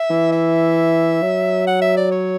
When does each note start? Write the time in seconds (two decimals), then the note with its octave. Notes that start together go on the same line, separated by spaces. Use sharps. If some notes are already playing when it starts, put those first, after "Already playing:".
Already playing: E5
0.10 E3
0.32 E5
1.22 F#3
1.67 F#5
1.82 E5
1.97 D5
2.12 C#5